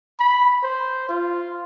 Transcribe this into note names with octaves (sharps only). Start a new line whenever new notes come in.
B5
C5
F4